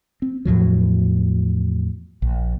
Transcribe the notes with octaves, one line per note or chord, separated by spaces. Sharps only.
C4
E2 A2 F3 F#3
A#1